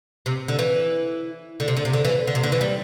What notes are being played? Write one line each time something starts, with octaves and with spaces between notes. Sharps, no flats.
C3
D3
E3
D3
C3
D3
C3
D3
E3
D3
C3
D3
E3
G3